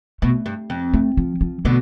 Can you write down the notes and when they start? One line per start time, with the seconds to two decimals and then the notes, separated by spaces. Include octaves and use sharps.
0.22 B2 A3
0.46 G2
0.70 F2
0.94 A3
1.17 F3
1.41 F3
1.65 B2 D3 A3